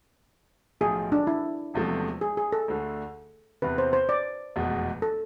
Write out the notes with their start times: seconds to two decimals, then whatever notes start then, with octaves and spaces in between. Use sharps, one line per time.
0.81 B1 A2 F3 G#4
1.12 D4
1.27 E4
1.74 E1 E2 C3 F3 A3
2.21 G#4
2.37 G#4
2.52 A4
2.68 D2 D3 A3
3.62 E2 C3 E3 B4
3.78 C5
3.93 C5
4.09 D5
4.56 F1 E2 B2 G#3 B3
5.02 A4